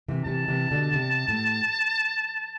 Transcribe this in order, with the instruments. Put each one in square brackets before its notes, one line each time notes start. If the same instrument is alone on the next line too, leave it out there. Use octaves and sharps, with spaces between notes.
[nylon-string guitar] C3 E3
[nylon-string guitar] C3 E3 [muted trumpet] A5
[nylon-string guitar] C3 E3
B2 D3
C3
A2